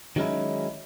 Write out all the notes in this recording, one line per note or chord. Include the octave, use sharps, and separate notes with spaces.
D#3 F#3 G#3 C#4 D#4 E4